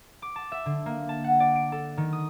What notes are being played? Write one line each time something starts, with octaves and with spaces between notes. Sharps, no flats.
D6
A5
E5
D3
A#3
A5
F#5
D5
D7
A4
D#3
D#6